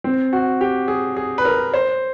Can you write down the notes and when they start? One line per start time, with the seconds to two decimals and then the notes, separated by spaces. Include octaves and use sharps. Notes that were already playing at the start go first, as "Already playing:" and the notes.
0.04 C4
0.33 F#4
0.61 G4
0.88 G#4
1.17 G#4
1.38 B4
1.45 A#4
1.74 C5